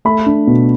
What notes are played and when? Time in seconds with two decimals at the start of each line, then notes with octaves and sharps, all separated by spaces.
0.05 A3 B5
0.26 D4
0.47 B2